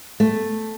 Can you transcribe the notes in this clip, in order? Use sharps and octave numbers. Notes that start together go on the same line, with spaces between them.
A3